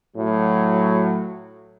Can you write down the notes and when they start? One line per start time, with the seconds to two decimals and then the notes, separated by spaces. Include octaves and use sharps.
0.16 A2 F#3